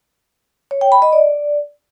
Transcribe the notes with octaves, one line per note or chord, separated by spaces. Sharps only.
C#5
G5
B5
D#5
D5